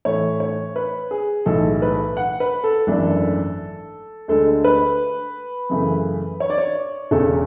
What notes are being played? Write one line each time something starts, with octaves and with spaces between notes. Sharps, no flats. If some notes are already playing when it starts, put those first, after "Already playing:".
A2 E3 A3 C#5
C#5
B4
G#4
B1 A2 E3 G#3 A4
B4
F#5
B4
A4
G#1 F#2 E3 A3 D4
D2 D3 G#3 A4
B4
F#2 C#3 E3 A3
C#5
D5
C#5
E1 E2 C#3 A4